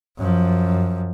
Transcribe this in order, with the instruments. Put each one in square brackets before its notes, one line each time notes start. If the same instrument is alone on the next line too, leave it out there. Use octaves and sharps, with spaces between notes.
[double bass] F#2 F3